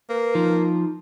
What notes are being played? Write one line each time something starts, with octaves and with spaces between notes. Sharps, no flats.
A#3 B4
F3 D#4